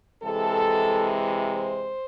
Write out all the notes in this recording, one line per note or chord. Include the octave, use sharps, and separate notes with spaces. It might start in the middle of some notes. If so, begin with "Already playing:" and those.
C3 E3 G#3 A4
C5